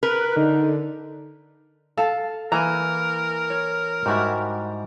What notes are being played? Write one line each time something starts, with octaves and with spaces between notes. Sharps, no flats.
A#4 B4
D3 D#4
A4 F5 A5
E3 A#3 E4 A#4 G#5 A#5
C#5
G#2 G3 E4 F#4 G4